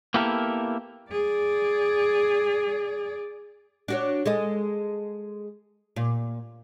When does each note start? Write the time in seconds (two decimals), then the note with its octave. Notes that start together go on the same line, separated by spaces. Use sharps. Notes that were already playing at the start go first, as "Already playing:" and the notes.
0.14 A#3 B3 E4 G4 A4 A#4
1.11 G#4 D5
3.88 D4 F#4 C#5
4.26 G#3 A4 D#5
5.96 A#2